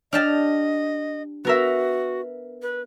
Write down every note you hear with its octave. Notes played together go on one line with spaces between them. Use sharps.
D4 G4 D#5 A5 F6
B3 F#4 A#4 E5
B4